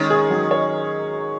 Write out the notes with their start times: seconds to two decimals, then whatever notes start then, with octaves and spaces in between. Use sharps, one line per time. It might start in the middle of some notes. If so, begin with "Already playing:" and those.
Already playing: D#3 G#3 C#4
0.10 G#4
0.30 F#3
0.51 C#5